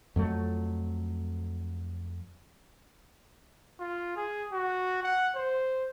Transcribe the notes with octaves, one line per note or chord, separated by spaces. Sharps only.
F2 F#3 A3
F4
G#4
F#4
F#5
C5